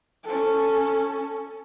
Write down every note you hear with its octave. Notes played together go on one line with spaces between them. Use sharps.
C#4 A4